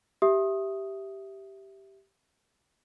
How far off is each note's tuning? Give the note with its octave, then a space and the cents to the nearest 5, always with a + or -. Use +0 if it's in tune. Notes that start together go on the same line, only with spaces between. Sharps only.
G4 -10 E5 +0 D#6 +0